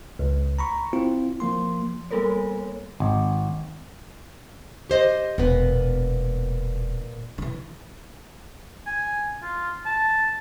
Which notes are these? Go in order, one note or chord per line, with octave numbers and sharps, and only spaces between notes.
C#2
A#5 B5 C#6
C4 E4 F4
F3 A#3 C6
G3 A#3 B3 A4 A#4 C#5
G#1
G4 C5 D#5
E1 A#2 B3
D#3 E3
G#5
F4
A5